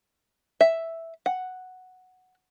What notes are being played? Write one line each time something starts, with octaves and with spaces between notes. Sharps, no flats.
E5
F#5